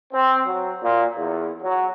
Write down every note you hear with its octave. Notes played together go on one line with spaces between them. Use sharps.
C4
F#3
A#2
E2
F#3